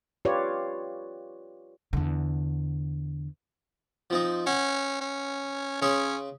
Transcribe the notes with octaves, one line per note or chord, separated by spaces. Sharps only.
F4 G4 B4 C#5 D5
E2 D3
F3 C4 D#4
C#4 F#5
C#4
C#3 C#4 G#4 C6